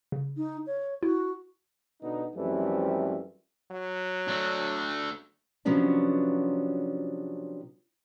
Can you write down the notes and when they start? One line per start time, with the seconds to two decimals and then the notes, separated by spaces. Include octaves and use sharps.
0.12 C#3
0.37 D#4
0.67 C#5
1.03 E4 F#4
2.02 B2 D3 B3 D#4
2.35 F#2 E3 F3 G3 A3 C4
3.71 F#3
4.28 A3 D4
5.65 C3 F3 F#3 B3 C#4 D4